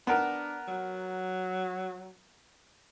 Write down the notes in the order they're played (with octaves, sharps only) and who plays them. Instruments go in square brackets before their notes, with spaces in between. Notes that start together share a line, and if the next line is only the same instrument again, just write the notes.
[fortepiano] B3 A#4 [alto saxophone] D4
[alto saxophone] F#3